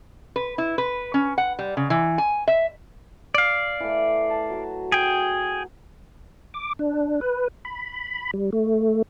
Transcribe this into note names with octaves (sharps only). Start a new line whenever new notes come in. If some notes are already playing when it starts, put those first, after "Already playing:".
B4
E4
B4
C#4
F#5
G3
C#3
E3
G#5
E5
D5 F5
E3 A3
A5
F#3 F#4
G#4 G5
D6
D4
B4
B5
G3
A3